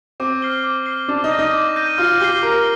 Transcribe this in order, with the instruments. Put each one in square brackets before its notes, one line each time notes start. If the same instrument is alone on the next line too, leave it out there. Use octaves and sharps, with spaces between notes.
[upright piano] C4 [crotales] D6
[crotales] F6 C7 G7
D6
F6 C7 G7
[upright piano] D4 [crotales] D6
[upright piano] D#4
[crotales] G6 A#6 D#7
[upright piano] D#4
[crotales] D6
G6 A#6 D#7
[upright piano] F4 [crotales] F6
[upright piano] G4 [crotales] C7 G7
[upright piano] A#4 [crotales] F6